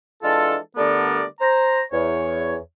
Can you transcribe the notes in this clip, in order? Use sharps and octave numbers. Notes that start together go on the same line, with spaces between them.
E3 G#3 D4 F4 A4
D3 G3 A3 B3 A#4 D5
C5 A#5
E2 C#5